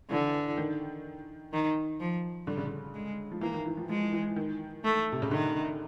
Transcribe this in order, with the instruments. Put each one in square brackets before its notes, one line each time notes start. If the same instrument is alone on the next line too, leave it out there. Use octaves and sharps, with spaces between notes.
[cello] D3 [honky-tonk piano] E3
[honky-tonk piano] D#3
[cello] D#3
F3
[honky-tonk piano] D3 [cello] G3
[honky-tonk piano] C#3
D3
[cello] G#3
[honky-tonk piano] F3
[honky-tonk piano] E3 [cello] A#3
[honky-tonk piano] D#3
E3
F3
[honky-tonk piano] F3 [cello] G#3
[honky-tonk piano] E3
D#3
[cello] A3
[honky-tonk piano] C3
C#3
[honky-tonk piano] D3 [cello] D#3